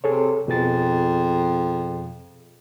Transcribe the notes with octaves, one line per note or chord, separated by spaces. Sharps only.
C3 G#4 A4 C#5
F2 B2 G#4 A6